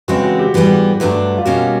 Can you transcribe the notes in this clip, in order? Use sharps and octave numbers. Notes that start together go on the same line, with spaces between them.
C#3 E3 G#3 C4 F#4
F#4
G4
G#2 E3 G3 B3
G2 D3 F#3 A3 D4
F4
B2 G3 A#3 C#4 F#4